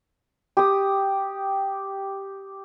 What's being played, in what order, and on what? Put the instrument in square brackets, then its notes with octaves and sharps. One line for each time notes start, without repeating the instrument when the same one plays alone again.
[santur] G4 D#6